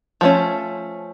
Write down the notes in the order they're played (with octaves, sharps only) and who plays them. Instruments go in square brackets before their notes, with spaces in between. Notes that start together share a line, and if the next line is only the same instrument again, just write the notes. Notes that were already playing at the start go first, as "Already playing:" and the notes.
[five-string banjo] F3 A3 C#4